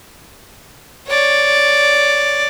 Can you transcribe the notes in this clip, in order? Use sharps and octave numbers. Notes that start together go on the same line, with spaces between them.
C#5 D5